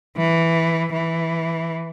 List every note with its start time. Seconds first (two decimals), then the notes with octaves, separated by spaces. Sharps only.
0.17 E3
0.93 E3